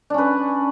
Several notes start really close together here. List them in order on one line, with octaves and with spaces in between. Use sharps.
D4 C#4 B4